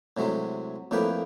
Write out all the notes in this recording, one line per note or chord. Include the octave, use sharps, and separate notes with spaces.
A2 C3 F#3 G#3
F2 A2 A#3 B4 G5